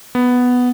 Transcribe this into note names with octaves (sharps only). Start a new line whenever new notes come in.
B3